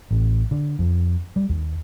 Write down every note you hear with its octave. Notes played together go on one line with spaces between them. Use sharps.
A1
D3
F2
G3
D#2